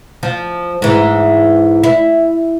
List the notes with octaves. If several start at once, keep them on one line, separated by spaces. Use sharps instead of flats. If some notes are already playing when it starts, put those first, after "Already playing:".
F3
G#2 E3
E4